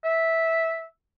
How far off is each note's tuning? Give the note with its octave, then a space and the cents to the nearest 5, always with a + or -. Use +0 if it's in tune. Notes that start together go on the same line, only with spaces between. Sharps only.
E5 -10